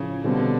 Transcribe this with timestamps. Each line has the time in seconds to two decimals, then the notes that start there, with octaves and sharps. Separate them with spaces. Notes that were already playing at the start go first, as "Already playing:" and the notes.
Already playing: A2 C#3 F3
0.23 B2 D3 G3 C4